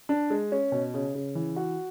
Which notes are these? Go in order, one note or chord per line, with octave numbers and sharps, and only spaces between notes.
D4
G#3
C#4
B2
C#3
C#3
E3
F#4